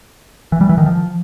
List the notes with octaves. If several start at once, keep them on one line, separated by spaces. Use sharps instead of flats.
E3
G3
E3
D#3
F3